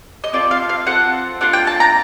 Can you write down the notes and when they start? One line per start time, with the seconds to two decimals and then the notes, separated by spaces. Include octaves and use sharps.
0.24 D#5
0.33 C4 F4 A4 D5
0.51 F5
0.69 F5
0.86 C4 F4 A4 F#5
1.41 A#3 D4 F4 F#5
1.53 G5
1.67 A5
1.80 A#5